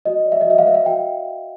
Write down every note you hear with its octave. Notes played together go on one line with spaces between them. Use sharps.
F#4 D#5
D5
E5
D#5
F#4 E5
F5
B4 E5
F5
F#4 G5